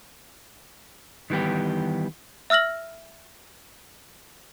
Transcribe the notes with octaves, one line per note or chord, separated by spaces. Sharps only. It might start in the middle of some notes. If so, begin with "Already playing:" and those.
D#3 E3 G3 B3 G4
E5 E6 F6 A#6 F#7